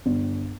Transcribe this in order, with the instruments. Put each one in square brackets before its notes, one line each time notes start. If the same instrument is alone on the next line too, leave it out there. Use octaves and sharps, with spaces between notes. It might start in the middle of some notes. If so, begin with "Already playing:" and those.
[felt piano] G1